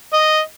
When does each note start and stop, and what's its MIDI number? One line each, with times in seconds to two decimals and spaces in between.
0.13 0.39 75